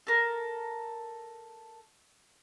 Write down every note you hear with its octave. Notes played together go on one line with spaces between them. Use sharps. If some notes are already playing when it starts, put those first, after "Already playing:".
A4 A#4